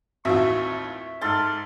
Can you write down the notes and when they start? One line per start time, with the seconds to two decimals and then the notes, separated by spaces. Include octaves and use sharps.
0.25 A1 D#2 C4 F4 F#4 E5 C#6
1.21 G#2 A4 F5 C6 A6